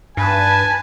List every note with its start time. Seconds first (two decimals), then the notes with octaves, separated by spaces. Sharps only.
0.17 G2 B4 G#5 A5